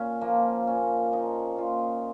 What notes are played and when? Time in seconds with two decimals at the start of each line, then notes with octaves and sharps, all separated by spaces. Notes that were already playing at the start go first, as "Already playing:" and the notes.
Already playing: A#2 C#4
0.21 F3 A#3
0.67 A#2 C#4
1.12 F3 D#4
1.57 A#2 F4